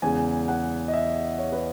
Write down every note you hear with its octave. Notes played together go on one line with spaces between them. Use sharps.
E2 C#3 G#3 G#5
F#5
D#5
E5
C#5
B4